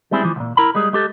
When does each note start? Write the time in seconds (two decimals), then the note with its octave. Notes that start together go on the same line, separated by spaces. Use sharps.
0.11 G3 G#3 C4 E4 G#4
0.23 E3 F3
0.36 C2 A#2
0.57 E4 A#4 A#5 B5
0.75 G3 G#3 G#4
0.93 G#3 G4 A4